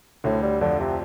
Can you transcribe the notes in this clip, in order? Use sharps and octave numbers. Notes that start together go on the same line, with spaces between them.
D2 A2 D3
G3
F2 D3 F3
C3